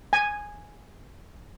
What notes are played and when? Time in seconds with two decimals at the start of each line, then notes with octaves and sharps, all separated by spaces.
0.13 G#5